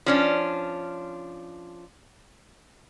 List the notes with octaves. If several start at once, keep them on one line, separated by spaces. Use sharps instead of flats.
F3 C#4 D4